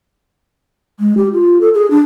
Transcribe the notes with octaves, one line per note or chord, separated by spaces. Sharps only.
G#3
G4
F4
A4
G#4
D4